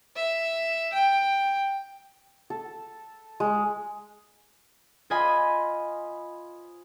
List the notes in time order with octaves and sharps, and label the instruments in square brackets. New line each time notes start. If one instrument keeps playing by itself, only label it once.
[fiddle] E5
G5
[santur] A4
G#3
[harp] F4 C5 D#5 G#5 B5